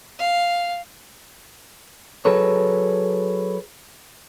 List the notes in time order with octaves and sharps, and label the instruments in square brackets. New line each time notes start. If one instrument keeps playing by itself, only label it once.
[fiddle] F5
[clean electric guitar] F#3 G#4 A4 B4 C#5